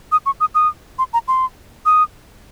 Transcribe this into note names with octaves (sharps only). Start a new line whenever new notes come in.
D#6
C#6
D#6
D#6
C6
A#5
C6
D#6